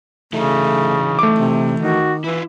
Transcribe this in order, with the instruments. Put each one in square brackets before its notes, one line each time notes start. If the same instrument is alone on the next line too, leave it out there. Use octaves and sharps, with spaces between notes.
[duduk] C#3 [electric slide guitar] E3 F#3 D#4 [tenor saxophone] A3
[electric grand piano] A3 D6
[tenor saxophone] C3
[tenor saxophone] D#3 [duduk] F#4
[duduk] E3 [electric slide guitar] E4 F4